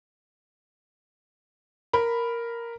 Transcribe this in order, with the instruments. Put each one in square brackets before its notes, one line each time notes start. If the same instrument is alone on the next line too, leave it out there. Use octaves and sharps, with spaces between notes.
[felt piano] A#4 B5